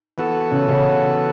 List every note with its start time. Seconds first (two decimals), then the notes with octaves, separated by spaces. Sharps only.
0.18 E3 B3 F#4 A4
0.51 C#3 C#4
0.68 C#3 C#4